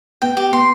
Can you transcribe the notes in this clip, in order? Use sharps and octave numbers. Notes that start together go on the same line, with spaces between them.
B3 G5
G4
B3 C6